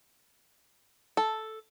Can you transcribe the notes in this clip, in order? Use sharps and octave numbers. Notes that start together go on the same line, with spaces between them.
A4